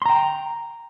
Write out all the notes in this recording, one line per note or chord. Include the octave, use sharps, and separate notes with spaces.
G5 A#5 C6